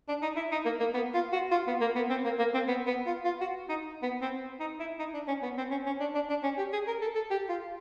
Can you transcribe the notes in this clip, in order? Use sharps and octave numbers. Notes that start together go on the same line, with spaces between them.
D4
D#4
E4
D#4
A#3
A#3
B3
F4
F#4
F4
B3
A#3
B3
C4
A#3
A#3
C4
B3
B3
F4
F4
F#4
D#4
B3
C4
D#4
E4
D#4
D4
C#4
B3
C4
C#4
C#4
D4
D4
D4
C#4
G4
G#4
A#4
A4
A4
G4
F4